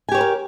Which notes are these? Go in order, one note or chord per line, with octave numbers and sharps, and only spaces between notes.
G4 A#4 C5 C#5 G#5